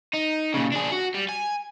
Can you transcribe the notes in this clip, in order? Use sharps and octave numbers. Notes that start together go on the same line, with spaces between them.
D#4
A#2 C#3
D4 G#4
F#4
G3
G#5